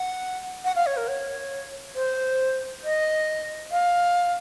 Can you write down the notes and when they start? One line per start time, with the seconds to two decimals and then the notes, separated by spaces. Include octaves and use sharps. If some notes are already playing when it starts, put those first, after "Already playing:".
Already playing: F#5
0.64 F#5
0.76 F5
0.86 C#5
0.97 A#4
1.08 C#5
1.95 C5
2.84 D#5
3.71 F5